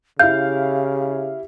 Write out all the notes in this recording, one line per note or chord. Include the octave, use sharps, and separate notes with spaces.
C#3 E4 G4 F5 G6